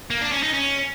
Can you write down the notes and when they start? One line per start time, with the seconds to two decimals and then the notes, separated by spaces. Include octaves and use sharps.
0.10 A#3
0.21 D4
0.32 C#4
0.43 D#4
0.54 C#4